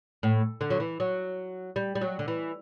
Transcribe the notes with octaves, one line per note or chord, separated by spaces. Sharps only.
A2
D3
F#3
E3
F#3
G3
G3
F#3
D3
E3